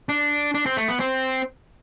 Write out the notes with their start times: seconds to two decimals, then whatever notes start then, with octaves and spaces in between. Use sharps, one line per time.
0.09 D4
0.54 D4
0.66 C4
0.77 A3
0.88 B3
1.00 C4